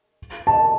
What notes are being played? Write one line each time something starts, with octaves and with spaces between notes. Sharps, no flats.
A5